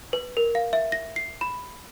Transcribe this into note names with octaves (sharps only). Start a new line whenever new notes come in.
B4
A#4
F5
E5
A#6
C7
B5